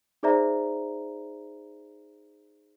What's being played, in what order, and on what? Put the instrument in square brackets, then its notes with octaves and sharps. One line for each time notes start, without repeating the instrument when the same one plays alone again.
[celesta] D#4 G#4 C5 D5 E5 A#5